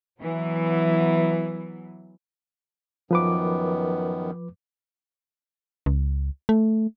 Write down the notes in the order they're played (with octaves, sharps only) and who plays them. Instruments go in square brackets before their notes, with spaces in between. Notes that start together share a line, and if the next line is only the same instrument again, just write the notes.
[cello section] E3 F#3 B3
[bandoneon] F#2 D#3 B3 [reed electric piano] F3 B4 D6
[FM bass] C#2
A3